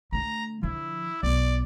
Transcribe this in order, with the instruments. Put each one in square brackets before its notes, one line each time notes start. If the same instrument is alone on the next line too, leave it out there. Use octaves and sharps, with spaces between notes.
[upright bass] D3 A3 [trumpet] A#5
[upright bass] D3 F3 [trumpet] E4
[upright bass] B1 [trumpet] D5